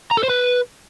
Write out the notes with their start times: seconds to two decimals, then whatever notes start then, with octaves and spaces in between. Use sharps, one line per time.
0.11 A#5
0.17 A4
0.23 C5
0.30 B4